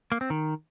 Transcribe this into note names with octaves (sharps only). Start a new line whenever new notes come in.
A#3
C4
D#3